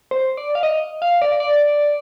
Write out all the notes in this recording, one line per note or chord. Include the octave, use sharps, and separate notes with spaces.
C5
D5
F5
D#5
F5
D5
D5